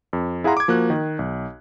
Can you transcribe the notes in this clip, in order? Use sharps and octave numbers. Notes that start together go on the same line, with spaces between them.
F2
E4 G#4 F5 F#5 A#5 C6
D6 G#6
F3 A#3 F#4 F#6
D#3
B1